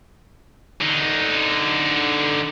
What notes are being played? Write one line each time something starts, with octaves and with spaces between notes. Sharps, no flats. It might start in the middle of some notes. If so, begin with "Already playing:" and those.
D3 D#4